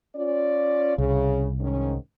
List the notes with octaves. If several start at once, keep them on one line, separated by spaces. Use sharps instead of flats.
C#4 F4 D5
C2 C#3
G#2 D#3 C#4